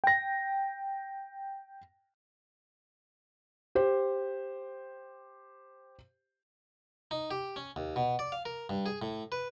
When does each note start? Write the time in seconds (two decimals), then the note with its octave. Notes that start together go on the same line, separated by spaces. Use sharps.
0.04 G5 A#6
3.75 G4 C5
7.11 D#4
7.31 G4
7.56 C#4
7.76 D#2
7.96 B2
8.19 D5
8.32 F5
8.45 A#4
8.69 G2
8.86 G#4
9.02 A2
9.32 B4